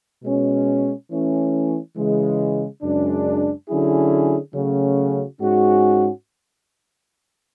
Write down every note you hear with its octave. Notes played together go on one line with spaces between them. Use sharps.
B2 G#3 C#4
E3 A3 C#4
C#3 E3 G#3
F#2 C#3 G#3 D4
D3 F#3 C#4 E4 G#4
C#3 F#3 A3 C#4 F#4
G#2 G#3 C#4 F#4